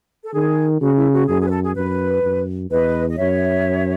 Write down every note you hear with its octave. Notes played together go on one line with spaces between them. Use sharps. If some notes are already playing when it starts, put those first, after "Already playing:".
A4
D#3 G#4
C#3 F#4
E4
F#4
F#2 G#4
G#4
B4
A4
G#4
F#2 B4
F#2
E2 B4 D#5
D#5
F#2 C#5 E5